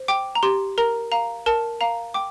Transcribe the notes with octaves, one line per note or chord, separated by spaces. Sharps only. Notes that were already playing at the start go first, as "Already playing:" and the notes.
Already playing: C5
G5 D6
A#5
G4 C6
A#4 A#5
F5 A#5
A#4 A5
F5 A#5
G5 D6